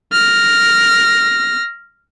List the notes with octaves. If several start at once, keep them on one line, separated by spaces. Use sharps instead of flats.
F6 A#6